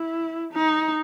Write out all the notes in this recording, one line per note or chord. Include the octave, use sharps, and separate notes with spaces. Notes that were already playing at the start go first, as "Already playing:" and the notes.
Already playing: E4
D#4